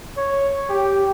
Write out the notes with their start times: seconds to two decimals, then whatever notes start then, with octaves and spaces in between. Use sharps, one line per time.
0.17 C#5
0.70 G4